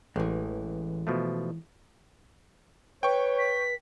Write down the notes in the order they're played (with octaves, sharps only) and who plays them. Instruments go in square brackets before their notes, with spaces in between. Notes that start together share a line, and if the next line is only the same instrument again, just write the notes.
[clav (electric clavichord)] A1 [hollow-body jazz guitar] E3 G#3
[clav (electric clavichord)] B2 F3 A3
[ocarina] B4 [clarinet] C#5 [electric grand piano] G5 C#6
[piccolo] B6